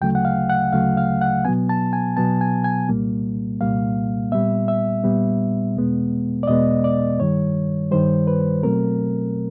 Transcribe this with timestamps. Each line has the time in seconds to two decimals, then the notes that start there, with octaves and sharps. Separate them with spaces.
0.01 D2 C#3 F#3 A3 G5
0.15 F#5
0.25 F5
0.49 F#5
0.73 D2 C#3 F#3 A3 F5
0.97 F5
1.21 F#5
1.45 B2 F#3 B3 G#5
1.69 A5
1.93 G#5
2.17 B2 F#3 B3 A5
2.41 G#5
2.64 G#5
2.89 C2 A#2 G3 A#3
3.61 C2 A#2 G3 A#3 F5
4.32 A#2 G3 B3 E5
4.68 E5
5.04 A#2 G3 B3
5.76 E2 B2 G#3 B3
6.43 D5
6.47 E2 B2 G#3 B3 D#5
6.84 D5
7.20 G2 D#3 G3 C#5
7.91 G2 D#3 G3 C5
8.27 B4
8.63 B2 F#3 A3 C4 A#4